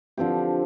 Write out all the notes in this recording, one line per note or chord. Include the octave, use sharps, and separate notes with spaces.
D3 F3 C4 G4